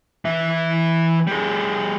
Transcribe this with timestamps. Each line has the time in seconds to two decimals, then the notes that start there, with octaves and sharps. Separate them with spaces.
0.25 E3 E5
1.27 G3 G#4